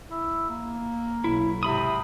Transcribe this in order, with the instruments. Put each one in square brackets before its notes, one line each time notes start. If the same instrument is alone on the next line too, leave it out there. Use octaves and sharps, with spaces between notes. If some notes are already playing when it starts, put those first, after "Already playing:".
[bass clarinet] E4
A#3
[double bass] B1 [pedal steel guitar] E4
[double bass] G#2 [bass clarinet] C3 [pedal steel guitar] E5 B5 D#6